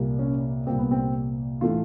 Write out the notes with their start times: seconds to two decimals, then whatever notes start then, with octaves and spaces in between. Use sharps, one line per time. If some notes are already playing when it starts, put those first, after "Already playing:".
Already playing: C2 A#2 G3 A#3
0.19 C#4
0.67 C2 A#2 G3 A#3 C4
0.79 B3
0.91 C4
1.61 A2 E3 A3 F4